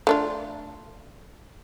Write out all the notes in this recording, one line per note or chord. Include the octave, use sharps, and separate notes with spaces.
A3 D4 F4